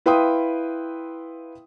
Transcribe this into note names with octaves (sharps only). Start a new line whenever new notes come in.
E4 B4 F5 G5 C6 D#6